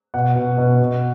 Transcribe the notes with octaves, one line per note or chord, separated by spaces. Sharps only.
B2 F#5
B2
B2
B2